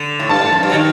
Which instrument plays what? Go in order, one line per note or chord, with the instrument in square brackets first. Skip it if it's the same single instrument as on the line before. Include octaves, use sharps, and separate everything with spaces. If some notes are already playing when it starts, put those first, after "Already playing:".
Already playing: [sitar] D3
A2
[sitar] G2 [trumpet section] A5
[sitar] A2
F#2
G2
F#3
D#3